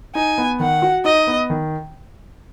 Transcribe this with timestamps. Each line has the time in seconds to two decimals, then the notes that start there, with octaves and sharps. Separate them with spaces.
0.15 D#4 G#5
0.38 B3
0.60 D#3 F#5
0.82 F#4
1.05 D#4 D#5
1.27 B3
1.50 D#3